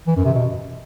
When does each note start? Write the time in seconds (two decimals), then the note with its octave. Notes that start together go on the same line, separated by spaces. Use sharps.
0.07 E3
0.16 F#2
0.25 C3
0.34 B2